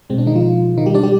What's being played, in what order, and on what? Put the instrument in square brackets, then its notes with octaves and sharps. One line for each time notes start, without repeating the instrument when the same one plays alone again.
[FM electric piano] B2 G#3 C4
D4
D#3 D#4
F3 F4
D#3 D#4
G3 G4
D4 D5
G3 G4